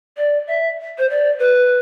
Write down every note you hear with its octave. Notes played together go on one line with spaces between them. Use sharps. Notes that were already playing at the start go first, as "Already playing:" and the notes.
D5
E5
C5
D5
B4